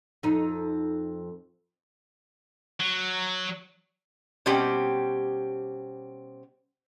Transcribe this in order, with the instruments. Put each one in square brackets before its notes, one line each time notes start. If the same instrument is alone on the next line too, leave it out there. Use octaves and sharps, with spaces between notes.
[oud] F2 D#4
[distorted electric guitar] F#3
[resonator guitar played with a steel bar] B2 G3 C4 C#4 G4